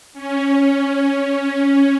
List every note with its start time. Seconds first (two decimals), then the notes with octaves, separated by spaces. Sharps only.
0.13 C#4
0.84 C#4